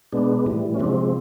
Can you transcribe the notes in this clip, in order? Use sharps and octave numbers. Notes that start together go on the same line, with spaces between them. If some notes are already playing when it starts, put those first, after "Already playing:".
B2 G#3 B3 D4
A2 E3 G3
C#4
C3 F3 G#3 C4 D4